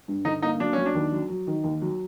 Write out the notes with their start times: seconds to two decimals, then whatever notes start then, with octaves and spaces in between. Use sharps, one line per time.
0.08 G2
0.25 D3 D#4
0.42 A#3 D#4
0.60 F#3 D4
0.73 F#3 C#4
0.86 D4
0.95 D#2
1.12 F#3
1.29 F#3
1.47 D#3
1.64 D#2
1.82 F#3